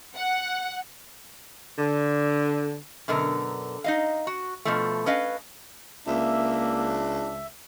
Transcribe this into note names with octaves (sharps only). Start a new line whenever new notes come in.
F#5
D3
F#2 B2 D3 A#4
D#4 D#5 F5
F#4
B2 F3 A3
C#4 B4 D#5 F5
C#2 A#3 D4 E5